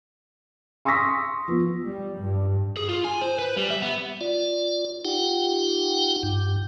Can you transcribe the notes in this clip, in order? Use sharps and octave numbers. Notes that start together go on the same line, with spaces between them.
C6 C#6 D#6 E6 A#6 B6
F3 B3
G3
G2
G#4
F4
G#5
C5
B4
G3
E5
B3
F4 D5
D#4 F4 G4 F#5 G5
G2